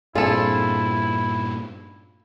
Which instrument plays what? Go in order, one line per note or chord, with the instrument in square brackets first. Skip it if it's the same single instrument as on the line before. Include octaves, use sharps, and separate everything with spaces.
[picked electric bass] G2 A#2 [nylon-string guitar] C4 D4 G#4 [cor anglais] E4 [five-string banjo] F4 A4